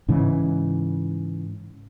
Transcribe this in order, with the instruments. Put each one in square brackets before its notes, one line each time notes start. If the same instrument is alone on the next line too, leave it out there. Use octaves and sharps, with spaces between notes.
[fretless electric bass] G#2 C#3 E3